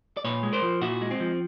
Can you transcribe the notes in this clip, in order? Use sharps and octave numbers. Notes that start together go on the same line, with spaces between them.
D5
A#2 B4 C#5
G#3
A#4 C5
F3
A#2 E4 F#4
G#3
C4
F3